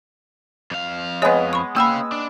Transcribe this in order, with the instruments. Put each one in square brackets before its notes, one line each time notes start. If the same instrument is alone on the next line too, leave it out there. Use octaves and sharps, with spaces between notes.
[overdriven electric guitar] F2 F5
[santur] G#3 B3 [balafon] C#5 D#5
[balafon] B5 C#6
[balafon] A#3 G5 B5 [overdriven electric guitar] C#4 F5 [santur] E6
[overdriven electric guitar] D4